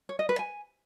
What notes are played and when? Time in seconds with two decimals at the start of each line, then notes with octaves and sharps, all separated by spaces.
0.09 C#5
0.19 D#5
0.29 B4
0.39 G#5